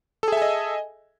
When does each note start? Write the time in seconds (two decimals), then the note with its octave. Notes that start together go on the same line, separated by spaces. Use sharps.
0.23 A4
0.28 G#4
0.32 E5
0.37 G#5
0.42 D#5